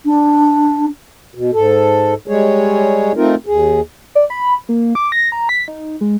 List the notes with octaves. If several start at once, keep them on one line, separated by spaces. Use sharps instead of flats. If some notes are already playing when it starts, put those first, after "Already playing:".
D4
B2
G#2 A4
G3 G#3 G#4 C#5
A3 C4 D#4 F4 A#4
D#2 G#4
D5
B5
A#3
D6
A#6
A#5
B6
D#4
G#3